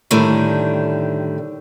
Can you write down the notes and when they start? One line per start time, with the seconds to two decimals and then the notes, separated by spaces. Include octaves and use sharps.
0.11 A2 D3 D#3 G3